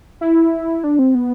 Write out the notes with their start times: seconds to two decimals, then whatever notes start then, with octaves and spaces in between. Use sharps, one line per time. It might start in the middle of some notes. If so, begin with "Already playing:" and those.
0.21 E4
0.84 D4
0.99 C4
1.15 B3